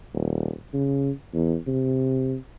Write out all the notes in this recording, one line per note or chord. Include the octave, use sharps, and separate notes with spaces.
D#1
C#3
E2
C3